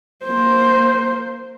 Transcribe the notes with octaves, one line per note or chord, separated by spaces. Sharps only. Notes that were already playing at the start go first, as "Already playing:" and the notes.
A#3 C5